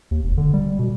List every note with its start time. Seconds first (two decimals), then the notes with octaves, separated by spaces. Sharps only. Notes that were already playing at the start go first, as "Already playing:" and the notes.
0.11 D#2
0.23 E1
0.38 D3
0.54 G3
0.79 B2